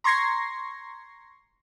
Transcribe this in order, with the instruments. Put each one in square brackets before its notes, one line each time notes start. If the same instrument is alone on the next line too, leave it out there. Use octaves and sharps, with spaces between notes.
[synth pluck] A#5 C6 C#6 G#6 A#6 C7